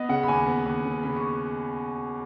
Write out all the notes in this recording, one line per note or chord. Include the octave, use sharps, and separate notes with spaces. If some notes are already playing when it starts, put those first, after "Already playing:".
Already playing: B3 D#5
C#3 F#5
B5
D#2 G#5
B3
D#2
C#3
C#3 B5
C#6